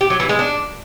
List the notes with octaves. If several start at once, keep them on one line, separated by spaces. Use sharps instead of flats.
G4
F#3
E3
G#3
D4